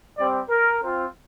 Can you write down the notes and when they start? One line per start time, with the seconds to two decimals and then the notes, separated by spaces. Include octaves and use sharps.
0.18 G3 C4 G4 D5
0.50 A#4
0.82 C4 F4